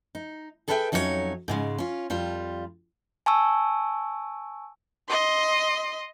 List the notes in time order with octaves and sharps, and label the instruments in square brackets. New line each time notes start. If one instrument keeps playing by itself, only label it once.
[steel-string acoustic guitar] D#4
G#4 A4 B4 E5 F5 G5
F2 F#3 C#4 D#4 F#4 C#5
G#2 C#3 G#3
C#4 F4
F2 G3 F4
[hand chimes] G#5 A5 C#6 E6
[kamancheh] D#5 C6